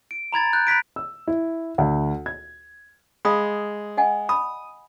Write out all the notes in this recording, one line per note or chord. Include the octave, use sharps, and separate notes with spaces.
D7
A#5 B5 G#6 A6
F#6 G6
B5 F#6 B6 D7
E6
E4
D2
G#6
G#3 F5 B5 D#6
D#5 F#5 G#5
B5 D#6